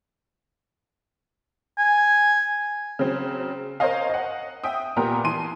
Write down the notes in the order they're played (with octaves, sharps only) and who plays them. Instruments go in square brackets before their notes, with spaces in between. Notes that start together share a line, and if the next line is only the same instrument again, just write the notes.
[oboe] G#5
[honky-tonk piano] C#3 F#3 C4
A#4 C5 C#5 D#5 F5
D#5 F#5
E5 G5 D#6
A#2 B3 G4 A#4 A#5
E3 A5 C6 D#7